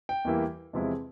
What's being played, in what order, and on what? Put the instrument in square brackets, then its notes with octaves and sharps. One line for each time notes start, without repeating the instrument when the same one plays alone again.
[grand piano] G5
E2 E3 G3 A#3 E4
E2 C3 F3 G#3 E4